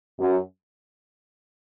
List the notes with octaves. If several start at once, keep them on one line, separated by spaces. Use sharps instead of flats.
F#2